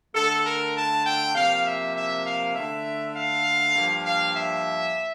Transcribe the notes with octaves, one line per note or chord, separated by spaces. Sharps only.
D3 A3 A4
A#4
A5
G5
C3 F3 A#3 F5
E5
E5
F5
D3 A3 E5
F5
G2 F3 A#3
F5
E5